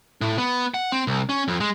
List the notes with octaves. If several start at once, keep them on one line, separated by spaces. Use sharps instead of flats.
A2
B3
F#5
C4
C2
C#4
F2
G#3